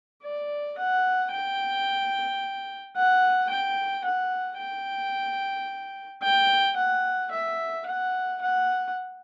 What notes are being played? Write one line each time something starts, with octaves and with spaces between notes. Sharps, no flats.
D5
F#5
G5
F#5
G5
F#5
G5
G5
F#5
E5
F#5
F#5